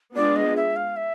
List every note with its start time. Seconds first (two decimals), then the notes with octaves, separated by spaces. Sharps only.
0.16 G#3 B3 D4 F4 G#4 D5
0.36 D#5
0.56 E5
0.76 F5
0.96 E5